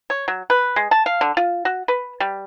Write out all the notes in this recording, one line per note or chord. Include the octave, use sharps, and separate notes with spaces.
C#5
F#3
B4
G#3
A5
F5
D3
F4
F#4
B4
G3